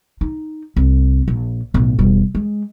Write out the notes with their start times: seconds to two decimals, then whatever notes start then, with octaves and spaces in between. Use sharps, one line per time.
0.21 D#4
0.76 C2
1.28 A#1
1.74 B1 A2
1.99 E1 G3
2.35 G#3